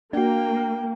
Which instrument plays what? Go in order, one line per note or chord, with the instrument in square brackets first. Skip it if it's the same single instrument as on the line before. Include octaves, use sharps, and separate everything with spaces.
[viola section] A#3 [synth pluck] D4 F#4 [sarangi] G5